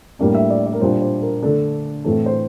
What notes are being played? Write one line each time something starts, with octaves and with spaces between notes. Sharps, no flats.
A2 G3 A#3 D4 A#4
E5
D5
D5
A#4
A#2 G3 D4 C5
C5
A#4
D3 A3 D4 A4
A2 E3 A3 C4 A4
C5